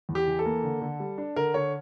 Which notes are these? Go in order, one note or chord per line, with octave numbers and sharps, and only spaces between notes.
E2
G4
E3
A4
A#3
D3
D3
G3
D4
D3 A#4
D3 C#5